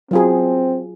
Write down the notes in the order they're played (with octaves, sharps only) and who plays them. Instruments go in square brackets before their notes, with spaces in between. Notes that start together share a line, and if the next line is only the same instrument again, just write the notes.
[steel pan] F#3 F4 G#4 [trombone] C4